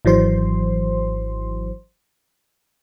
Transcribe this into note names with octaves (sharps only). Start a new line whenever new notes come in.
G#1 E3 F#3 C5 C6